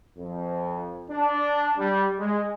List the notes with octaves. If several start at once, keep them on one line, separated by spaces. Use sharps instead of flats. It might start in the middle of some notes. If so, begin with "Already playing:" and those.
F2
D4
G3
G#3